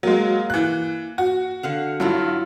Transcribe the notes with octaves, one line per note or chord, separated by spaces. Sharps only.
F#3 G#3 A#3
E3 F#6
F#4
D3 F5 F#5
G2 F#3 E4 F4